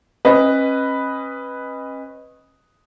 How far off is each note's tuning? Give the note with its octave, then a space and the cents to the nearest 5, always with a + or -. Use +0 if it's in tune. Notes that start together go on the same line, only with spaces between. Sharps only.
C#4 -40 B4 +0 D#5 +0